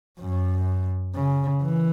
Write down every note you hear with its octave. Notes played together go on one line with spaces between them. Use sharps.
F#2
C#3
E3